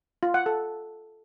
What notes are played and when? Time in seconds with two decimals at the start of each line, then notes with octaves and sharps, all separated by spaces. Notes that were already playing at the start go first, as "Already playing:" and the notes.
0.23 F4
0.34 F#5
0.46 A4